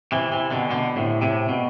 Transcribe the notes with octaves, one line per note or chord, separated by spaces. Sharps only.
C3 E3
C3 E3
B2 D3
B2 D3
A2 C3
A2 C3
B2